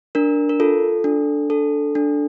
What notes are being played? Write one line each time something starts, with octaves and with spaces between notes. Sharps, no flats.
D4 A#4
A#4
F4 A4
D4
A4
D4